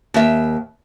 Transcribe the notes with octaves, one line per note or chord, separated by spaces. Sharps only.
D#2 E5